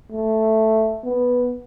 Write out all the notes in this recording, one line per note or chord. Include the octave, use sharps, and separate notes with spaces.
A3
B3